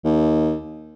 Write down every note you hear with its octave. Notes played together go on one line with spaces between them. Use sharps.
D#2